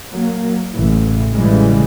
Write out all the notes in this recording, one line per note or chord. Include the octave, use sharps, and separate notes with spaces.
F#3 A#3
A1 C#3 E3
A1 C#3 E3 G3 G#3